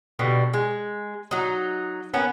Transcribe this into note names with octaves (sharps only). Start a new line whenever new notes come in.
B2 D3 G3
G#3
F#3 D#4
D#3 B3 C#4